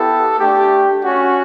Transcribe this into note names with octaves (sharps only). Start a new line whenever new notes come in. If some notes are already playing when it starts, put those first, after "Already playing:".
Already playing: B3 E4 G4 A4
A3 D4 G4
C#4 F#4